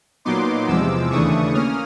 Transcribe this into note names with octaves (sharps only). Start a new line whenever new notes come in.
A#2 F#3 B3 D#4 C6 D6
E2 C3 F3 G#3 D6 E6
D#2 C#3 E3 A3 D4 C#6 D#6
A#3 C#4 D#6 F6